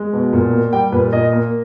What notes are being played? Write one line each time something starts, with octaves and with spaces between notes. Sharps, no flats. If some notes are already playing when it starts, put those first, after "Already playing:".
Already playing: G#3
B2
A#2
A#3
G3 G5
A#2 B4
A#2 D#5
A#3